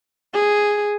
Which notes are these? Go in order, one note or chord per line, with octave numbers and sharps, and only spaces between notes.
G#4